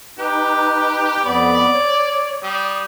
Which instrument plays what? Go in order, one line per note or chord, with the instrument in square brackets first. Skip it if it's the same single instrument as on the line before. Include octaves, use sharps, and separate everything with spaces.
[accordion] D#4 B4 [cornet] G4
[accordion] F2 B3 B5 [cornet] D5
[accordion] C#5
[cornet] G3 [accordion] D#6